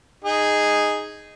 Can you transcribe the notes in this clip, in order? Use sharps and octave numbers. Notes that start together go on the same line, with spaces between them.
D#4 G#4